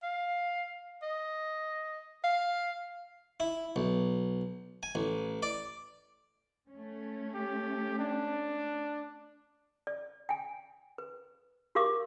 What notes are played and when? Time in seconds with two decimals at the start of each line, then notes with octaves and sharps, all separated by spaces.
0.03 F5
1.02 D#5
2.24 F5
3.40 E4
3.76 B1
4.83 G#5
4.95 A1
5.43 D5
6.71 A3 C#4
7.35 G4
7.99 D4
9.87 D5
10.29 G5 G#5
10.98 B4
11.75 F#4 G4 A#4 F5 C#6 D6